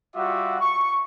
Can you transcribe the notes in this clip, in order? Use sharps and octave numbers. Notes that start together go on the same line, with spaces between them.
G3 F4 F#4 E5 F#5 D6
C#6